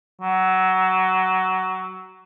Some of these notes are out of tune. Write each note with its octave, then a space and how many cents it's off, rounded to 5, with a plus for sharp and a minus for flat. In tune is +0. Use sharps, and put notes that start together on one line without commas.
F#3 +15